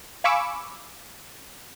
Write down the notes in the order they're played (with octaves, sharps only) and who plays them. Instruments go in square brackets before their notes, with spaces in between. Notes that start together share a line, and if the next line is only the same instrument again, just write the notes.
[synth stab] F5 G#5 B5 C#6 D6 E6